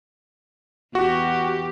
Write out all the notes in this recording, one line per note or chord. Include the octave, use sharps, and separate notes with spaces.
E2 F#4 G4